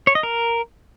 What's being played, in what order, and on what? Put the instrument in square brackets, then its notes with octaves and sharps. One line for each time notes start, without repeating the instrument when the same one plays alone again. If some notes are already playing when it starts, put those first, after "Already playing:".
[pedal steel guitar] C#5
D#5
A#4